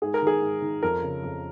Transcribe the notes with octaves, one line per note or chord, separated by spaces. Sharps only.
G#2 G#4
A#4
D#3 G#4
G#2
D#3
F2 A#4
C#3
F2